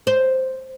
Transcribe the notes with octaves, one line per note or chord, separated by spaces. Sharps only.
C5